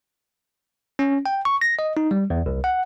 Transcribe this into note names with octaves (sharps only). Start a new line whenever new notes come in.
C#4
G5
C#6
A#6
D#5
D#4
G3
E2
C2
F#5